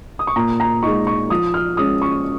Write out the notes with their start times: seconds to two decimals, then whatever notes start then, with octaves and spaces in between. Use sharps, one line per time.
0.19 D#6
0.27 C#6
0.36 A#2 A#5
0.60 A#5
0.83 G#3 D#4 C#6
1.07 C#6
1.30 F3 D#6
1.54 F6
1.77 G#3 C#4 D#6
2.02 C#6